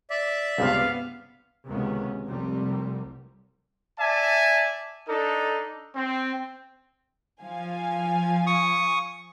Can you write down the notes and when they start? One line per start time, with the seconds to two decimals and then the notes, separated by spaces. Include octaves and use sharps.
0.10 D5 E5
0.58 C#2 G2 C3 B3 F5
1.68 C#2 C3 D#3 B3 C#4
2.25 F1 C2 C3 G3
3.99 D5 E5 G#5 A5
5.07 D4 D#4 A4
5.95 C4
7.42 F3 F5 G#5
8.47 C#6 D#6